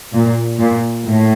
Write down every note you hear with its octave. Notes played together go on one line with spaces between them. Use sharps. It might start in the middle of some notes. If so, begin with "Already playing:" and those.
A#2
A#2
A2